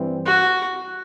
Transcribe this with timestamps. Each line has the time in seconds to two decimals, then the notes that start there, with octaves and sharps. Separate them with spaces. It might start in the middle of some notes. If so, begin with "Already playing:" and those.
Already playing: G2 E3 G3 C4
0.26 F#4